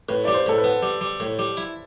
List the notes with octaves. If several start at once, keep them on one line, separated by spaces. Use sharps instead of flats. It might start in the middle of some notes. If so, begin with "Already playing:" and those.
A2 B4
G3 D5
C5
A2 A4
B4
B3
G3
G3
A2
G3
E4